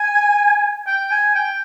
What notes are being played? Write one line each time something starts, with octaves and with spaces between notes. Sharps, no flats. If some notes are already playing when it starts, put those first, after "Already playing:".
Already playing: G#5
G5
G#5
G5